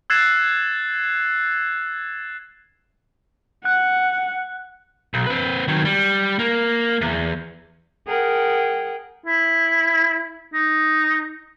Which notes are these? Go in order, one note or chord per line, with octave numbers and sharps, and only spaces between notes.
E6 F#6 G#6 A6 C7 E7
F#5 F#6
B1
C4 B4
D#3 F#3
G3
A#3
E2
G#4 A#4 F#5 G5
E4
D#4